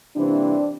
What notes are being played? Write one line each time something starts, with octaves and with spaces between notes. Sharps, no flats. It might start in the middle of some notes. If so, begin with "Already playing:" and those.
C3 E3 G3 A#3 C4 D4